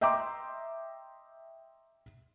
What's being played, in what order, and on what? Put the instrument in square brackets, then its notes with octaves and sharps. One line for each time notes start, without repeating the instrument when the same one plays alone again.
[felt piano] D#5 E5 G5 A#5 C6 D6